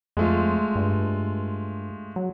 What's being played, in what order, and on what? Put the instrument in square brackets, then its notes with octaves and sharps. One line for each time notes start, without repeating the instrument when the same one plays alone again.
[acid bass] F2 [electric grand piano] G#3 A3 F4
[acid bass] G2
F#3